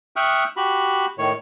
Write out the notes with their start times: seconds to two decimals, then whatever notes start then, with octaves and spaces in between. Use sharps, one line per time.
0.16 E5 G5 C#6 D#6 F6 F#6
0.57 F#4 G4 B5
1.18 A2 D#3 C#5